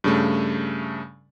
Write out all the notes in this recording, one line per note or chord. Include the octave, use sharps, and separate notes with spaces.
G2 C#3 A3